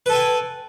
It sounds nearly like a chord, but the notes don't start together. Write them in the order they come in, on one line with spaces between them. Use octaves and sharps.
B4 A4 G#5 G5